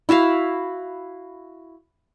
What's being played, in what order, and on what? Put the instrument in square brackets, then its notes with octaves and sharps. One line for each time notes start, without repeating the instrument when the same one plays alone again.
[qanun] E4 F#4 E5 F5